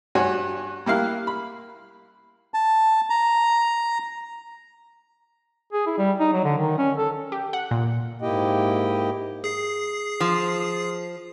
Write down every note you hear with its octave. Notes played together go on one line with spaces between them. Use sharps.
G2 F#4 C#5 G#5
G3 A#3 E4 F5 F#6
B5
A5
A#5
G#4
E4
G3
D#4
F#3
D3
D#3
C#4
A4
G4
F#5
A#2
G#2 A#3 E4 G4 D#5 G5
G#4 C7
F3